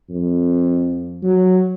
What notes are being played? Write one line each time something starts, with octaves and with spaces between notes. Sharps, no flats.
F2
F#3